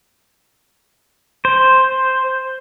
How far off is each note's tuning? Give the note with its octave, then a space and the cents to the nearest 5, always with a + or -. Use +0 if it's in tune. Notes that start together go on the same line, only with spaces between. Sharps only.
C5 +0